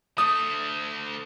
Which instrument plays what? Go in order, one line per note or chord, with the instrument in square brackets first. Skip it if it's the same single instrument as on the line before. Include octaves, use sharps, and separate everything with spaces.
[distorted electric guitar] D2 A3 [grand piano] D#6